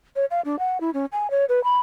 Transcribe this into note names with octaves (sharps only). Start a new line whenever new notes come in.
C#5
F5
D4
F#5
E4
C#4
G#5
C#5
B4
B5